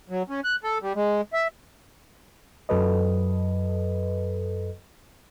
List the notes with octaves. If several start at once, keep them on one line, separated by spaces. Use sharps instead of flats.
F#3
C#4
F#6
A4
G3
G#3
E5
F#2 F#3 A4 B4 D#5